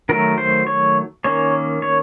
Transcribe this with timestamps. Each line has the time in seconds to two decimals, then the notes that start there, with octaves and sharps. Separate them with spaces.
0.09 D#3 F#3 A3 A#4
0.38 C5
0.67 C#5
1.24 D#3 A#3 C#4 C#5
1.82 C#5